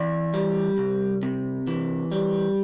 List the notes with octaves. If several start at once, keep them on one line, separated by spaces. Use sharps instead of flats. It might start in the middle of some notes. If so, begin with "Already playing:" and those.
Already playing: E3 D5
G3
C2
C3
E3
G3